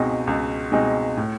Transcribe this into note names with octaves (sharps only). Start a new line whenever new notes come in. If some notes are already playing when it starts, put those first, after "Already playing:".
Already playing: C#2 B2 G#3 C4 D#4
C#2
B2 G#3 C4 D#4
A2